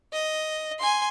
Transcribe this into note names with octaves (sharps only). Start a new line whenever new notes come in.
D#5
G#5 C6